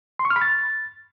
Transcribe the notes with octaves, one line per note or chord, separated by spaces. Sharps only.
C6
C#6
F6
B5
A6